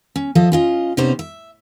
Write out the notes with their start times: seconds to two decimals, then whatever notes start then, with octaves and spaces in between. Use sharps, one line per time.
0.16 C#4
0.35 F3 A4 D#5 E5
0.52 C#4 F4 D#5
0.97 C3 B3 C#4 D#4 C5
1.19 E5